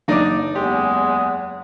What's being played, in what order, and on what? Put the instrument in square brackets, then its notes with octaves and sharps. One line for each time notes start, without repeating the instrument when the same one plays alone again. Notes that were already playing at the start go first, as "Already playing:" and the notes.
[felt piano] F#1 D6 [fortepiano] D4 D#4 D5
[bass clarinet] E2 [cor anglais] G#3 [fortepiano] G4